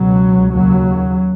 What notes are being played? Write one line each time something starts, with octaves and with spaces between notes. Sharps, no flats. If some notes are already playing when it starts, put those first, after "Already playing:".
Already playing: C#2 B2 F#3
D#2 C#3 F#3